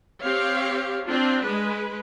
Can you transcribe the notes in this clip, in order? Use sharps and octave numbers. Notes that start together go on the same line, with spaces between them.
C4 G4 C#5 F5
C4 D4 F4
G#3 B4